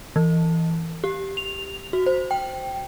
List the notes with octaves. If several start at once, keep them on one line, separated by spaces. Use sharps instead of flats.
E3
G4
F7
F#4
C5
G5